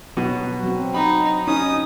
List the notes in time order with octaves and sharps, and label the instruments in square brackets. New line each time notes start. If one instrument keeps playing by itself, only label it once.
[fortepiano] B2 [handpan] F#3 F#4
[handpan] F#3 C4
[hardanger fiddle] D#4 [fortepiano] B5
[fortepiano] C#4 [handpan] D#4 [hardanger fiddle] D#6